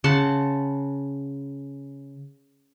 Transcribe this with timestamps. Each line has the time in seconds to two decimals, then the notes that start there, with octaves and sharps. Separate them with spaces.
0.04 C#3 F#5 A5 C6